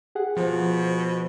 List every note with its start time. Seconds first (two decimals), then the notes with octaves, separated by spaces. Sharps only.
0.15 G4 G#4 F#5
0.37 B2 F3 C5